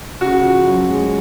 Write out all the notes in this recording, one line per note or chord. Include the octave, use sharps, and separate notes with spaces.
C#3 F#4
F3
F#2
G#3